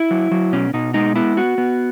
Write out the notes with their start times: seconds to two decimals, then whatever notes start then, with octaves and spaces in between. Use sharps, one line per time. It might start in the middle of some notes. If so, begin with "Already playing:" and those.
Already playing: E4
0.11 F#3
0.31 F#3
0.52 B2 C#4
0.74 B2 D#4
0.94 G#3 D#4
1.16 B3 E4
1.37 B3 F#4
1.58 B3